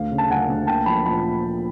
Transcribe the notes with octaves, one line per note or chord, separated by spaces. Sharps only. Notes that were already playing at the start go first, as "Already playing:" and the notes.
Already playing: D2 F5
C#3
A5
D2 F#5 G#5
D2
A#3 G5 A5
F3 A5 B5
A#2 A5 B5